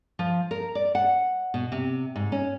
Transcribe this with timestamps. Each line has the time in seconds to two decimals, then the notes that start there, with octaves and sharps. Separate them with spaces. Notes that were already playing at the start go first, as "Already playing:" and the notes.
0.19 F3
0.51 A#4
0.75 D5
0.95 F#5
1.54 B2
1.72 C3
2.16 G#2
2.32 C#4